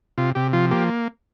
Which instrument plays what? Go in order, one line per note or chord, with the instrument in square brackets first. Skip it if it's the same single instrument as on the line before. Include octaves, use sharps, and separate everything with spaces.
[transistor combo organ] C3 F4
C3 G4
F3 F4
A#3 G4